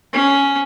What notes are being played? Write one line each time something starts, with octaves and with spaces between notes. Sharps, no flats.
C#4